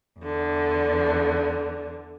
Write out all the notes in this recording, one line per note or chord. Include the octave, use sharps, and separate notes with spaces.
E2 D3